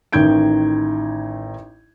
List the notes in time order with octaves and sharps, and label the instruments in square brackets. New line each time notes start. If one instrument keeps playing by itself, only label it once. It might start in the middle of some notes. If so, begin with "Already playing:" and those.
[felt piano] A1 D#3 D#4 G6 G#6 D7